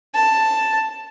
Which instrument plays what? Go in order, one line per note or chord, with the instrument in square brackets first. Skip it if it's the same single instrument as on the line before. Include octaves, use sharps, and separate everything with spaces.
[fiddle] A5